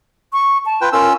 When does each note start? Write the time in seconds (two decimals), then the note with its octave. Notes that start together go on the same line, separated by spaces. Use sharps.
0.33 C#6
0.66 A5
0.81 F4 B4 G5
0.93 C#4 F4 A#4 E6